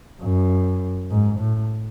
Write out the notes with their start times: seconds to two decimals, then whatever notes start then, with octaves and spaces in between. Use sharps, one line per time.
0.22 F#2
1.10 G#2
1.39 A2